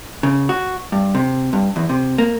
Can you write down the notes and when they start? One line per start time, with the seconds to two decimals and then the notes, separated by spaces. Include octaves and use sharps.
0.23 C#3
0.49 F#4
0.92 G2
1.15 C3
1.53 G2
1.76 E2
1.89 C3
2.18 A#3